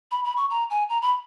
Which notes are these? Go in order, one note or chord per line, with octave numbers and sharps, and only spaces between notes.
B5
B5
C#6
A#5
G#5
A#5
B5